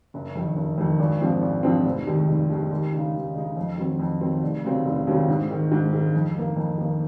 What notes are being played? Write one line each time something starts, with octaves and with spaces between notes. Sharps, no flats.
F#1
F2 D#3
F#1
F2 D#3
G#1
G#2 F3 C4
G#1
G#2 F3 C4
F1
D#2 D#3 G#3
F1
D#2 D#3 G#3
D#2
C#3 G#3 D#4
D#2
C#3 G#3 D#4
F2
D#3 F#3 C4
F2
D#3 F#3 C4
F1
D#2 C#3 F#3 C4
F1
D#2 C#3 F#3 C4
G#2
D#3 G#3
G#2
D#3 G#3
F2
D#3 A#3
F2
D#3 A#3